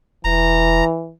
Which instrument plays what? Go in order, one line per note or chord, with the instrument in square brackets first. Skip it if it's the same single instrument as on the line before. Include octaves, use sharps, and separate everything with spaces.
[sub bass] E1 [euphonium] E3 [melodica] A#5